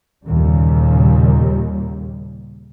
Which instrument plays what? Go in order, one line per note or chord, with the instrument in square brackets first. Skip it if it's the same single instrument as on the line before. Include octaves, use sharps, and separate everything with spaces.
[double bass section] D#2 A#2 C#3 G3